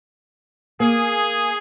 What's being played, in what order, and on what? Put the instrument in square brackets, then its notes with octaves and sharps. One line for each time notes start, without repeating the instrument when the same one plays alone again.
[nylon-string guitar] A#3 [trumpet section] G#4